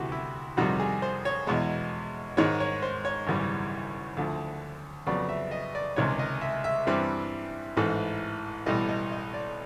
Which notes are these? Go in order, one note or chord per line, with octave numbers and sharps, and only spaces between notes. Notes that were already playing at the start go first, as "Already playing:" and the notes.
Already playing: D2 C3 E3 F#4 G4
E4
F2 C3 D#3 G3 F#4
G#4
C5
C#5
E2 B2 G#3
G#2 D#3 G#3 C#5
C#5
C5
C#5
G#1 F#2 C#3 E3 G3
D2 D3 F3
F2 C#3 F#3 B3 D5
E5
D#5
D5
C#2 C3 D#3 G#3 C#5
D#5
E5
E5
G2 E3 G3 C4
A1 G#2 E3 A3
B1 A2 E3 G3 D#5
D#5
D#5
D5